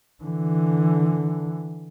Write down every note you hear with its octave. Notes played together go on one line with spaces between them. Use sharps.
D3 E3